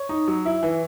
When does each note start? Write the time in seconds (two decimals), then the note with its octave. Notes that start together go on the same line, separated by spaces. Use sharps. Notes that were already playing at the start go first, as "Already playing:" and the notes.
Already playing: C#5
0.09 D#4
0.28 F#3
0.45 E4
0.63 E3